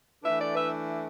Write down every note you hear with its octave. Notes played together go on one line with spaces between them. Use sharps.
E3 A3 D4 B4 E5
A4 D5
B4 E5